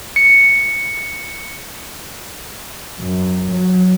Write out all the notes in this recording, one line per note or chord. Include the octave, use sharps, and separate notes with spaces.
C#7
F#2
F#3